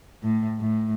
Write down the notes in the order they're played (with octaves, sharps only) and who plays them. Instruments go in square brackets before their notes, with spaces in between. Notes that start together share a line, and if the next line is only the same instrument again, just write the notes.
[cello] A2
A2